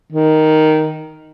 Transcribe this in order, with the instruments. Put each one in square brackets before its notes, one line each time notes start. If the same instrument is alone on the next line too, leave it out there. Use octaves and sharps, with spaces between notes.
[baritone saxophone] D#3